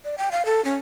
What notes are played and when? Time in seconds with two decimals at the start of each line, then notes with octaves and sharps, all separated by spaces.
0.05 D5
0.18 G5
0.31 F5
0.46 A4
0.65 C#4